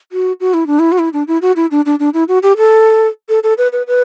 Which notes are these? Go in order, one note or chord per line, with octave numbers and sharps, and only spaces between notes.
F#4
F#4
E4
D4
E4
F#4
E4
D4
E4
F#4
E4
D4
D4
D4
E4
F#4
G4
A4
A4
A4
B4
B4
B4